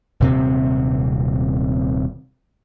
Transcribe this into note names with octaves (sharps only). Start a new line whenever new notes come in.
D#1 C3 C4